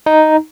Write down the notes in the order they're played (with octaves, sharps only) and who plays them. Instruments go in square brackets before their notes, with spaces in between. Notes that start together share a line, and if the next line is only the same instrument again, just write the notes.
[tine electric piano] D#4